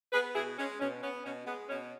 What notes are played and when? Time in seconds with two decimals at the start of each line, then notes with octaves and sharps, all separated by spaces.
0.13 B3 G#4 B4
0.35 B2 E4 G#4
0.58 G#3 C#4
0.80 B2 C#4
1.03 B3 C#4
1.25 B2 C#4
1.47 G#3 B3
1.69 B2 C#4